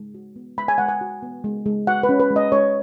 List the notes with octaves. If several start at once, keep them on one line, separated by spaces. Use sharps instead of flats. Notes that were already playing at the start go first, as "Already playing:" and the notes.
Already playing: G#3
F#4
B3
G#3 B5
G#5
G#3 F#5
G#5
F#4
B3
G#3
G#3
F#4 F#5
B4
C#4
B4
G#3
D#5
G#3 C#5